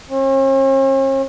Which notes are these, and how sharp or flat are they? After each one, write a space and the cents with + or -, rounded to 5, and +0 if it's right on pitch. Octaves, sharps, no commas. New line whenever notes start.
C#4 -45